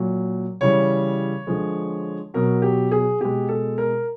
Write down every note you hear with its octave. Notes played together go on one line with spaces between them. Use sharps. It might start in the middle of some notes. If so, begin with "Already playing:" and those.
Already playing: A#2 F#3
C#3 E3 G3 C#5
D3 F3 G#3
B2 F#3 A#4
G4
G#4
B2 G#3 G4
A4
A#4